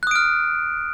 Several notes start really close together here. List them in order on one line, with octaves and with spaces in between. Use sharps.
F#6 D#6 D7 F6